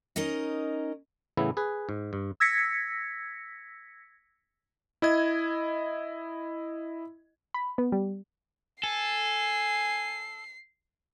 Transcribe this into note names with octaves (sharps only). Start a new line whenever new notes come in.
C#4 D#4 A#4 D#5
A2 C#3 E3 B3 E4
G#4 B4
G#2
G2
E6 G#6 A#6 B6 C#7
E4 D#5 G#6
B5
B3
G3
A4 G#5 C7